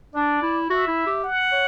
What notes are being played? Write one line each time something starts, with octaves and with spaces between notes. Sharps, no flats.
D4 D5
E4
F#4 E5
E4
G4
F#5
C#5